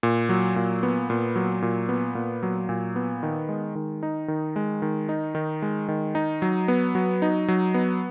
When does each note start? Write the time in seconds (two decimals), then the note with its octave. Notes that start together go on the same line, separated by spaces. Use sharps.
0.03 A#2
0.29 F#3
0.56 A#2
0.83 B3
1.10 A#2
1.36 F#3
1.62 A#2
1.89 B3
2.15 A#2
2.43 F#3
2.69 A#2
2.96 B3
3.23 D#3
3.49 G#3
3.75 D#3
4.03 D#4
4.28 D#3
4.56 G#3
4.82 D#3
5.09 D#4
5.35 D#3
5.62 G#3
5.88 D#3
6.15 D#4
6.42 F#3
6.68 B3
6.95 F#3
7.22 D#4
7.48 F#3
7.74 B3